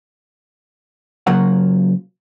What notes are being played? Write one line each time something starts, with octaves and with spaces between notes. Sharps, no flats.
C#3 F#3 A#3 F4 C5 F#5